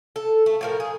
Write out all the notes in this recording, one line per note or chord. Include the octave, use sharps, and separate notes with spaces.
A4
A3
A2 F3 A#4
G#4